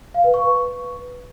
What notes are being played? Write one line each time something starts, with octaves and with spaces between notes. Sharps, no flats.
F5
B4
C#6
B4